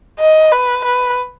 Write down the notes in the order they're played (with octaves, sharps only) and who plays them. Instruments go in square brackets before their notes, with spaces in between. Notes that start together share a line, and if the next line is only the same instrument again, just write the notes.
[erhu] D#5
B4
B4